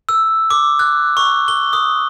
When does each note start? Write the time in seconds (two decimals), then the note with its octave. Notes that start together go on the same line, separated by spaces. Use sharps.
0.09 E6
0.50 D6
0.79 F#6
1.17 C#6
1.48 G7
1.73 D#6